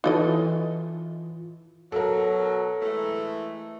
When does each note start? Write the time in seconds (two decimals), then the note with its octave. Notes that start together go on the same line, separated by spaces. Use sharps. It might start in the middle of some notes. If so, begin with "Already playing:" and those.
0.04 E3 D#4 F4 A4 D#5
1.92 B2 F#3 A4 A#4
2.82 E3 G#3 A3